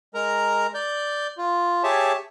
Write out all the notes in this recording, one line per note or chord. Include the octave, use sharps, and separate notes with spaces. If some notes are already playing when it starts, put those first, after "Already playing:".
G#3 A#4 A#5
D5 G6
F4
G4 G#4 C#5 E5 A5